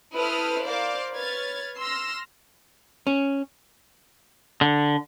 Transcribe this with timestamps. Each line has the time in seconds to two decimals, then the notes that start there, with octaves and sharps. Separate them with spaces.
0.15 E4 A4 B4 C5 D#6 F6
0.64 A#4 C5 D5 F5 D6
1.16 B4 C#5 F6 G#6 A6
1.80 C6 E6 F6 A#6
3.07 C#4
4.61 D3